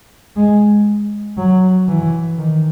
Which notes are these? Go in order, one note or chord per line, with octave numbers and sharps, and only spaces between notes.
G#3
F#3
E3
D#3